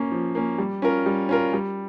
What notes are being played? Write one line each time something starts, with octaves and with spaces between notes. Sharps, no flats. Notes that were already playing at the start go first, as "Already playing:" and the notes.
Already playing: A#3 C#4
F3
A#3 C#4
G3
C#4 F4 A#4
G3
C#4 F4 A#4
G3